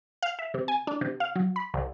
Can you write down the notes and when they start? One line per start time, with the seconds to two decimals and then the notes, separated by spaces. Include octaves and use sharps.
0.22 F5
0.39 E5
0.54 C3
0.68 G#5
0.87 D4
1.01 C3
1.20 F5
1.35 F#3
1.56 B5
1.74 C2